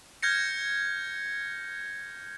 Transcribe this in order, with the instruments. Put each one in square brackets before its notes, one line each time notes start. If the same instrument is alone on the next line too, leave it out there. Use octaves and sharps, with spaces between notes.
[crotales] F6 G6 G#6 A#6 C#7